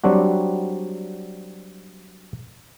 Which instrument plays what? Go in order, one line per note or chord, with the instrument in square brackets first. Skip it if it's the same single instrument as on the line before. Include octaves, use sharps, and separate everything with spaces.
[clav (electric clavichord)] F#3 G3 C4 D4 F#4